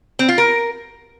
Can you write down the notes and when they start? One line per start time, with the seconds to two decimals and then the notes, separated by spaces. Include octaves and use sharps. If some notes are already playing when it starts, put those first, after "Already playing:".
0.19 C4
0.29 F4
0.38 A#4